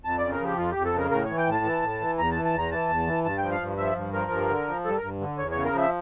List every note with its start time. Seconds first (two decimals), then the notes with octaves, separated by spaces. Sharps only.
0.05 F2 A5
0.18 C#3 D5
0.32 A#4
0.41 F3 G4
0.58 F2 F4
0.71 G4
0.76 F2
0.85 A4
0.94 C#3 A#4
1.11 A2 A#4
1.25 E3 C#5
1.38 G5
1.47 A2 A5
1.64 E3
1.82 A2
2.01 E3
2.18 E2 A#5
2.32 E3 A5
2.45 A5
2.54 E2 A#5
2.71 E3 A5
2.89 E2
3.07 E3
3.25 G2 A5
3.38 F3 G5
3.52 F5
3.60 G2
3.78 F3 E5
3.96 G2
4.13 F3 A#4
4.31 G2
4.49 D3
4.67 F3
4.85 G2 A4
4.98 G2 A#4
5.20 D3
5.38 E2 C#5
5.52 C#3 C#5
5.65 A#4
5.73 F3 E5